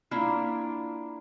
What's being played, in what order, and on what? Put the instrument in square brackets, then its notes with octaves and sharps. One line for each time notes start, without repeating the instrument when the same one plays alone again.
[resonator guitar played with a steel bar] A#3 D4 E4 F4